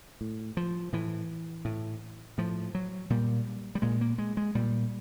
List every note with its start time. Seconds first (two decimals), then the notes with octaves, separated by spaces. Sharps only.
0.21 A2
0.57 F3
0.93 A2 E3
1.65 A2
2.38 A2 F3
2.75 F#3
3.10 A#2 G3
3.75 G3
3.82 A#2 G#3
4.01 A#3
4.18 G#3
4.37 G#3
4.55 A#2 G3